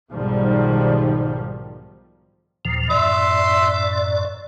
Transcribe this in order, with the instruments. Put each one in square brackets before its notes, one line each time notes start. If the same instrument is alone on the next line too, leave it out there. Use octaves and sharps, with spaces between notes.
[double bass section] B1 G#2 D#3 F3 G3
[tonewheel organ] D#2 A#2 F3
[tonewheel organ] F#2 A2 D5 [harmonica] E5 C6